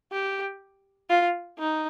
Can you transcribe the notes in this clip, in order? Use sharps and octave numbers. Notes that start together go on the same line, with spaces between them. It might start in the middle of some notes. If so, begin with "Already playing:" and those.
G4
F4
D#4